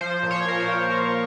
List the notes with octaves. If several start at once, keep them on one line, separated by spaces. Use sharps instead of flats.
F3 C5
A#2
C#5
A#2 A#4
C5
F3
F3 A#4